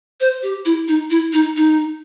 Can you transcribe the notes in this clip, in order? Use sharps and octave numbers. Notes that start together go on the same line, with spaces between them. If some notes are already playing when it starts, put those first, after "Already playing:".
C5
G4
E4
D#4
E4
D#4
D#4